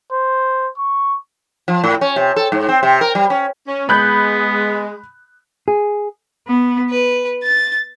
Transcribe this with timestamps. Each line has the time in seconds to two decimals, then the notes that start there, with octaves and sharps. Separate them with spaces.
0.12 C5
0.78 C#6
1.68 F3
1.84 A2
2.01 C#4
2.16 C3
2.36 A4
2.52 G#2
2.69 C4
2.83 C3
3.01 A#4
3.15 G3
3.30 C#4
3.66 C#4
3.89 G#3 B3 B5 F#6 G6
5.68 G#4
6.47 B3
6.91 B4
7.43 A6